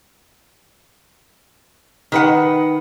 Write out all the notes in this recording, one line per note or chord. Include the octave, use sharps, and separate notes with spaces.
D#3 B4 F#5